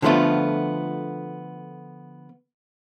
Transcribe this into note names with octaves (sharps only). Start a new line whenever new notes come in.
D3 F3 A3 B3 F4